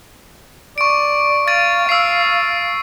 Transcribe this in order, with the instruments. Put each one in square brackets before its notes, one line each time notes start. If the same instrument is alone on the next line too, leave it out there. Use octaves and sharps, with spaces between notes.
[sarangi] D5 [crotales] C#6 D7
[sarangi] F5 [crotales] A6 D7 D#7
[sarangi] F5 [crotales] E6 C7